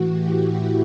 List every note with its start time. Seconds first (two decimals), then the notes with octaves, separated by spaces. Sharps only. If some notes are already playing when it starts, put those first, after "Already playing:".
Already playing: A2 E3 F#4
0.11 G4
0.47 E4